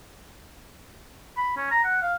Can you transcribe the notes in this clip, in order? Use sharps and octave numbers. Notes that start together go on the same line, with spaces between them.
B5
C#4
A#5
F#5
F5